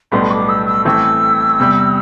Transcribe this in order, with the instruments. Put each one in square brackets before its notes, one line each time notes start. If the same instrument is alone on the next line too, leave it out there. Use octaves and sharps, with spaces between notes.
[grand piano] B1 A2 G3 B3 D4 [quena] C6
[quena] D6
E6
E6
[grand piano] A1 A2 E3 A3 C4 [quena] E6
[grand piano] E2 C3 G3